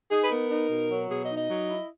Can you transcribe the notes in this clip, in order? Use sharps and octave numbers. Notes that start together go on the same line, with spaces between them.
D#4 G#4
B4
B3 A#4
D#4
B2
F#3
B2 G#4
D#5
D#4
D#5
F#3
E4